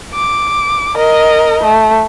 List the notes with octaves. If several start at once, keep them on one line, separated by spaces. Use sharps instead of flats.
D6
A#4 D#5
A3